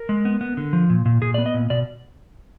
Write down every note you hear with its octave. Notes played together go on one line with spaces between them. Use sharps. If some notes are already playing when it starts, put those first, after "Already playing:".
Already playing: A#4
G#3
B3
B3
D3
F3
A#2
A#2
A#2 G#4
D5
B3
D#5
A#2
B2 D5